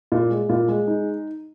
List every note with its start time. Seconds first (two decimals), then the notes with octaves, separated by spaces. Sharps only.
0.12 A#2
0.30 G#3
0.49 A#2
0.68 G#3
0.88 D#4